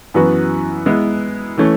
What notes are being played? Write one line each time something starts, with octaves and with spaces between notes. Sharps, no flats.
F#2 E3 B3 F#4 B4
G#3 B3 E4 B4
E3 A3 C#4